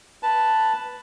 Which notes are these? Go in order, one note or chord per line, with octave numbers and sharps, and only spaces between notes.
B4 A5